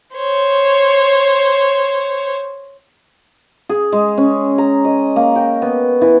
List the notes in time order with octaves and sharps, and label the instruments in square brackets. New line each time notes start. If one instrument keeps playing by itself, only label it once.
[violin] C5 C#5
[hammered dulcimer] G#4
G#3
C#4
A#5
D#5
A#3
G5
B3
E3